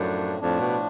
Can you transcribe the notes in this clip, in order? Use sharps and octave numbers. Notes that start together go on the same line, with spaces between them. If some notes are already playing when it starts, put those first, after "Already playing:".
Already playing: F#2 A2 F3 A3 D4
F2 A2 F3 A3 D4
B2